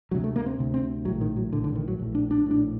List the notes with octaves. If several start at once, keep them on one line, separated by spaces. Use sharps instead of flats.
D2 C3 F#3
A3
A#3
C4
D2 C3
C4
A#1 A2 F#3
D#3
F#3
A#1 A2 D3
D3
D#3
F#3
A#1 A2
D4
D4
A#1 A2 D4